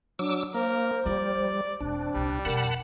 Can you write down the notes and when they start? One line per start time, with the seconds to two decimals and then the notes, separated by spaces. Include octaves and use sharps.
0.19 F#3 D4 D6 E6
0.54 A#3 A#4 C5
1.06 F3 G3 F4 D5
1.81 E1 E2 C4 D4
2.14 D#1 C2 G3
2.45 F2 B2 A#4 F#5 A5 B5